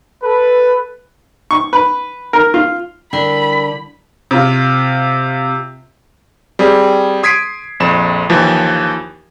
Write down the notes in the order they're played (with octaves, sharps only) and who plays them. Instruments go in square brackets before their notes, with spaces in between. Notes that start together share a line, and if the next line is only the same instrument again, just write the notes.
[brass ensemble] A4 B4
[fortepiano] C#6
B4
A#4
F4
[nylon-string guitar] D3 [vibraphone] G3 E4 A#4 [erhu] B5
[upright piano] C3 F4
[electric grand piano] G3 C4 G#4
C6 D#6 G#6 B6 C7 D7
A#1 F2 E7
D#2 E3 F3